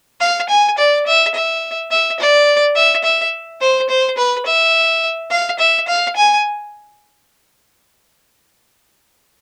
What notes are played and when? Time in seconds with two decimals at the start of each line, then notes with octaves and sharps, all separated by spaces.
0.21 F5
0.49 G#5
0.78 D5
1.07 E5
1.34 E5
1.91 E5
2.20 D5
2.75 E5
3.04 E5
3.61 C5
3.89 C5
4.17 B4
4.46 E5
5.30 F5
5.59 E5
5.88 F5
6.16 G#5